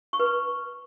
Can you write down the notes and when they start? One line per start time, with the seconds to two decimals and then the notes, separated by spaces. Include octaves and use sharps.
0.13 C#6
0.20 B4
0.26 C#6